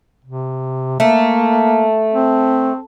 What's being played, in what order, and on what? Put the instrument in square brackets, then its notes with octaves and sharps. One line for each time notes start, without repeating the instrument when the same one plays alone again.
[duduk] C3
[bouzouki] A3 [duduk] A#3
[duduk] C4